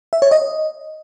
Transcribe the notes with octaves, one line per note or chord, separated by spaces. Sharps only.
E5
C#5
D#5